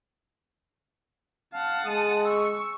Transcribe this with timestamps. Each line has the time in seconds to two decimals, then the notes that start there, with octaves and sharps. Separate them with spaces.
1.53 F5 F#5 A5
1.85 G#3 D#6
2.25 C#6 E6